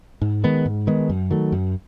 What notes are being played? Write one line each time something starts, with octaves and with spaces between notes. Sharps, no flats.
G#2
D#3 G#3 B3
G#2
D#3 G#3 B3
F#2
D#3 F#3 A3
F#2